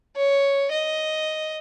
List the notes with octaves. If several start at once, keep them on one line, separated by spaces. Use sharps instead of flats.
C#5
D#5